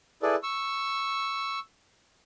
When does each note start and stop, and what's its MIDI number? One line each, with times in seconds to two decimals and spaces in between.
0.23 0.35 64
0.23 0.35 68
0.23 0.35 69
0.23 0.35 71
0.23 0.35 74
0.43 1.59 85
0.43 1.59 88